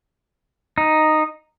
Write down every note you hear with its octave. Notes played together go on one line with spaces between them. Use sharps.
D#4